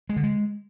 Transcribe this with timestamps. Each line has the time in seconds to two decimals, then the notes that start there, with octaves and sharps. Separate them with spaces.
0.09 G#3
0.16 D3
0.23 G#3